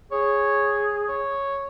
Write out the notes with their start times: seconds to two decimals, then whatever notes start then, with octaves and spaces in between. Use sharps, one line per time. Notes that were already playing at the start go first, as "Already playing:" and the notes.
0.12 G#4 C#5
1.08 C#5